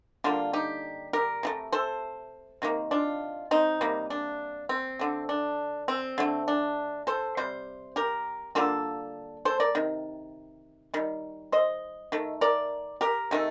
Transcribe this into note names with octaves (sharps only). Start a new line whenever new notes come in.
D3 G3 A#3 D4 F4
D#4 G4
G4 A#4
C3 F3 A3
A4 C5
C3 D#3 G3 A#3
D4 F4
C4 D#4
C3 G3 A#3
D4
C4
D3 A3
D4
C4
D3 A3
D4
A4 C5
C3 G3 C5
G4 A#4
D3 G3 A#3 F4 A4
A4 C5
A#4 D5
C3 D#3
D#3 G3
C5 D#5
D#3 A3
A#4 D5
G4 A#4
C3 D#3 A3